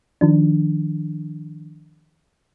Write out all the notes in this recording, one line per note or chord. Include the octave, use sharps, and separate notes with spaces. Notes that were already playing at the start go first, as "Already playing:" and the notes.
D#3 F3 D4